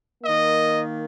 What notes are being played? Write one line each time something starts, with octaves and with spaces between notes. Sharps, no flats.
D#3 A#3 D#5